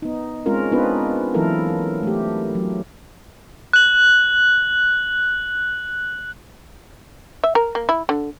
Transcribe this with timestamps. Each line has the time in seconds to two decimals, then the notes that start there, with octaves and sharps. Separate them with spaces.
0.02 B3 D#4
0.46 G#3 C4 C#4 F4 A#4
0.72 B3 C4 D4 D#4 F4 B4
1.34 E3 F#3 A#3 E4 A4 A#4
2.03 A3 G4
2.55 F#3
3.73 F#6 F#7
7.44 E5
7.55 A#4
7.75 A#3
7.89 E4
8.09 D3